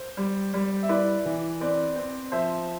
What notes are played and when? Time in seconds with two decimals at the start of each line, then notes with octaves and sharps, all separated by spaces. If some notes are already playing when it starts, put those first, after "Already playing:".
Already playing: C5
0.17 G3
0.54 G3
0.83 E5
0.89 E4 B4 D5
1.25 E3
1.60 C4 B4 D5
1.96 C4
2.32 F3 C5 E5